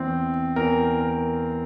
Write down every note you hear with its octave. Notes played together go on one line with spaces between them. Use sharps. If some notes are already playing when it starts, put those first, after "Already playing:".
Already playing: E2 E3 C4
E2 E3 A#4
A#4